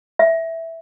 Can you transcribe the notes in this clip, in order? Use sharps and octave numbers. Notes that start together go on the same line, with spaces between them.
E5